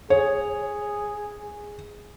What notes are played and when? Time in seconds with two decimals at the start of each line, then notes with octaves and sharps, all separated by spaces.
0.10 G#4 C#5